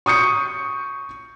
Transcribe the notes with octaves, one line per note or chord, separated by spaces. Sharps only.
C#6 D#6 G6 C#7